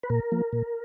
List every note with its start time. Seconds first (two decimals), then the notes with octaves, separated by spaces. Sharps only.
0.03 B4
0.10 A#2 A#4
0.32 F3 A#3
0.53 A#2